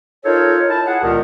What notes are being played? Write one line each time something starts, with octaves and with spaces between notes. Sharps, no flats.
D#4 F4 A4 A#4 C5 C#5
E4 A5
G#4 F#5
C#2 A#2 D#3 B3 G4 A#4